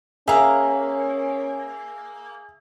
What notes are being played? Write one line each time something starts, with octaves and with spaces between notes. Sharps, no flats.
A#3 C#4 G#4 A#4 E5 A#5